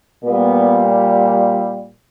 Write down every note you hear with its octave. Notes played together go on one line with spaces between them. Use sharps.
A#2 G3 B3